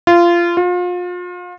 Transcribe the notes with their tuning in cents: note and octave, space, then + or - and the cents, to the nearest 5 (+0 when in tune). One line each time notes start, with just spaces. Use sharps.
F4 -20
F4 +35